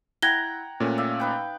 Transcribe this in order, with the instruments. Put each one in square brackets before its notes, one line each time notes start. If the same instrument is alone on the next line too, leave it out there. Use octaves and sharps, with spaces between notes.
[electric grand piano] E4 [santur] F#5 G5 A#5 [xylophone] G#6 A#6 G7
[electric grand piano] A#2 A3 C#4
[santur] D5 E5 F5
D#4 B4 G5